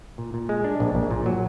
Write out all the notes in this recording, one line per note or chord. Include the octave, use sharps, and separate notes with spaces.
A#2
A#2
G#3
D4
A#1
A#1
A#2
F#3